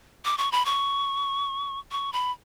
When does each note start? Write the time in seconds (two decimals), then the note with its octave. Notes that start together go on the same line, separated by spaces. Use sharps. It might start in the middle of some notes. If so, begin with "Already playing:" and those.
0.25 D6
0.38 C#6
0.52 B5
0.65 C#6
1.92 C#6
2.13 B5